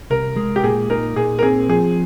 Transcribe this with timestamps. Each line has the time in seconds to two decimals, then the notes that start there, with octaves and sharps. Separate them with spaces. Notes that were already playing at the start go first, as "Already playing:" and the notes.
0.10 C2 A#4
0.36 G#3
0.56 G4
0.64 A#2 G#4
0.90 D#4 A#4
1.16 A#2 G#4
1.39 A#4
1.43 C4 G#4
1.69 F3 G#4